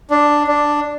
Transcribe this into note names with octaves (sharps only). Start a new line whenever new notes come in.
D4
D4